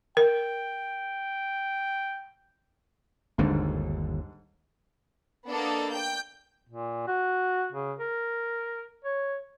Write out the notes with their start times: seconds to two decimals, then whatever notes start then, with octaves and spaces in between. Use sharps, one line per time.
0.17 A#4 G5
3.38 G1 D#2 G#2 D3
5.48 A#3 B3 D4 A4 D#5
5.91 G5 G6
6.69 A#2
7.07 F#4
7.73 C#3
8.00 A#4
9.04 C#5